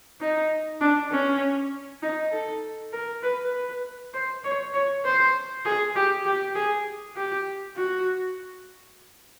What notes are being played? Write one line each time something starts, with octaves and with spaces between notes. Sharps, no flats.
D#4
D4
C#4
D#4
A4
A#4
B4
B4
C5
C#5
C#5
C5
G#4
G4
G4
G#4
G4
F#4